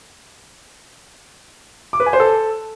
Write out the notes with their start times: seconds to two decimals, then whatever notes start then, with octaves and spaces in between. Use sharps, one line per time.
1.93 D6
2.00 B4
2.06 G#5
2.13 C5
2.20 A4